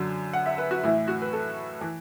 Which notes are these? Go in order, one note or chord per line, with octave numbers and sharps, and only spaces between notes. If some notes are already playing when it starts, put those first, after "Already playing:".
Already playing: F#2 D3 F#3
F#5
E5
B4
F#4
A2 E3 E4
F#4
B4
A4
E3